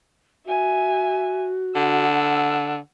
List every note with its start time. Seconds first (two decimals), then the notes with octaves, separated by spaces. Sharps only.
0.46 F#4 E5 G#5
1.75 D3 F#5 E6